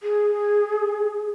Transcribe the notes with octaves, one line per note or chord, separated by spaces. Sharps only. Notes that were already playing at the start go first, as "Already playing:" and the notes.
G#4